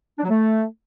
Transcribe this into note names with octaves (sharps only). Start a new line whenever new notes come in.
D4
F#3
A3